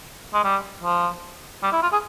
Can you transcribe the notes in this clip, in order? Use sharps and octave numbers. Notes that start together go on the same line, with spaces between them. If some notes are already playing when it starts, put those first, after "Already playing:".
G#3
G3
F3
G3
E4
F4
G#4